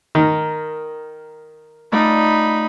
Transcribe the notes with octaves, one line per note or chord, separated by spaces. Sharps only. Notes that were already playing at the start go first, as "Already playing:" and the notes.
D#3 A#4 A#5
A3 D#4 F4 D5 B5